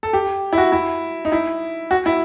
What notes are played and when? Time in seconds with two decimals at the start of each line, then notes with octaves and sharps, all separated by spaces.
0.03 A4
0.13 G4
0.53 E4
0.58 F#4
0.72 E4
1.25 D#4
1.32 E4
1.91 F#4
2.06 E4